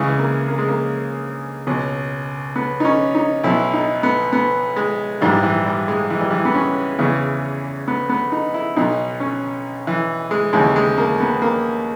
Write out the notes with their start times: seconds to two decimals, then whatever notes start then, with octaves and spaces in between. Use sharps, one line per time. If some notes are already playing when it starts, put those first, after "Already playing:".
Already playing: C#2 C#3 E3 G#3
0.19 A#3
0.48 A#3
0.59 G#3
0.68 A#3
1.67 C#2 B2
2.56 B3
2.80 D#4
2.85 C#4
3.15 D#4
3.44 B1 B2 E4
3.73 D#4
4.03 B3
4.33 B3
4.76 G#3
5.21 A#1 G#2 E3 G3
5.43 E3
5.66 G3
5.88 G#3
6.10 E3
6.21 G3
6.31 E3
6.45 B3
6.55 C#4
6.99 E2 C#3 E3
7.88 B3
8.09 B3
8.32 D#4
8.54 E4
8.76 B1 B2 D#4
9.20 C#4
9.87 E3
10.31 G#3
10.53 D#2 C#3 E3 G#3
10.76 G#3
10.98 A#3
11.20 B3
11.42 A#3